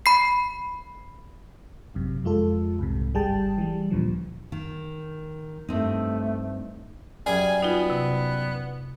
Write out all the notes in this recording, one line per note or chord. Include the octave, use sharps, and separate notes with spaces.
B5 C7
G#1 F#2 C3
F2 G#3 F4 A4
C2 G#2 C3
G1 G3 G#4 G5 A5
E3 G3
D2 A#2 D3 E3 F3
D#3
G2 A3 C4 D#4
F#2 G3 G#4 G#5
B3 D#4 F4 F#4
C3